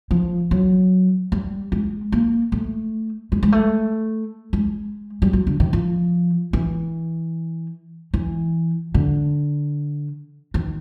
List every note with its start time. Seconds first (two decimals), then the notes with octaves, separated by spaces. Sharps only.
0.11 F3
0.51 F#3
1.32 G3
1.72 G#3
2.12 A#3
2.52 A3
3.32 G#3
3.43 G#3
3.52 A3
4.53 G#3
5.22 G3
5.33 F#3
5.47 D3
5.60 D#3
5.73 F3
6.53 E3
8.14 E3
8.94 D3
10.54 D#3